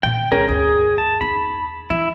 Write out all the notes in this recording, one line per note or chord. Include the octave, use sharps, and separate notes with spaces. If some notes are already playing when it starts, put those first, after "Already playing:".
A#2 D#3 G5
C#2 C#4 G#4 A#4
D2 G2 G#4
A5
E2 D#4 B5
E3 E4